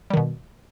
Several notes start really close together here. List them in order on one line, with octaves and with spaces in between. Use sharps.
G3 D#3 B2